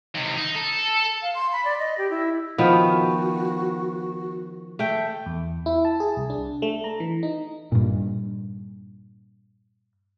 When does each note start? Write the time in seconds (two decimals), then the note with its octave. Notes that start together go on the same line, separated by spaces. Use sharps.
0.14 D#2 C3
0.37 D#4
0.55 A4
1.22 F5
1.35 C6
1.52 B5
1.65 D5
1.79 D#5
1.98 G4
2.10 E4
2.58 D#3 F3 B3 F#4
4.79 A3 G5
5.26 E2
5.66 E4
5.85 A5
6.00 G#4
6.16 C2
6.30 D4
6.62 A3
6.84 A#5
7.00 E3
7.23 D#4
7.72 G2 A#2